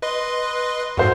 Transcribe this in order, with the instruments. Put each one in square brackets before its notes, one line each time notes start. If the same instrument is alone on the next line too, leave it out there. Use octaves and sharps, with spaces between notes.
[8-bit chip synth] B4 D#5 C6
[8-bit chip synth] F2 G#2 [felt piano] F#4 A4 C5